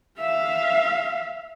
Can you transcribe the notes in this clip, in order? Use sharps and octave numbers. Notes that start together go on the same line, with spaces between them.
E5 F5